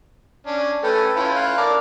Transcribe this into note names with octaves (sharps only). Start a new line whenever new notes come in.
C#4 D4
A3 C#4 A4 B4 G5
C#4 E4 F4
F5 F#6
A#4 D5 A5